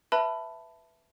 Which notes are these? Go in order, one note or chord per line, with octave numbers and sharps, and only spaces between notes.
B4 E5 A5 B5 F#6